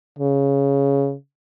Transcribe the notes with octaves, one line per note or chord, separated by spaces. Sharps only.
C#3